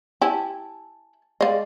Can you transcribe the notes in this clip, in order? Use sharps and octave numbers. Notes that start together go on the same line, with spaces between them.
E4 G4 G#5 A5
G#3 D5 D#5 F5